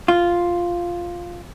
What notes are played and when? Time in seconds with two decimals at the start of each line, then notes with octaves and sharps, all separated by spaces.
0.08 F4